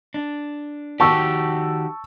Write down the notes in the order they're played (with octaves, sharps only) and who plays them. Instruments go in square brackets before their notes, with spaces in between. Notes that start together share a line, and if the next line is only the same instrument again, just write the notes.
[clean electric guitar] D4
[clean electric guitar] D#3 F#4 G4 [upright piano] A5 C#6 E6